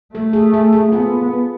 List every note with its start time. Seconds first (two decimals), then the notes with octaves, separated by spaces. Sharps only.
0.14 A3 A4
0.33 G#4
0.54 A4
0.73 G#4
0.92 B3 F4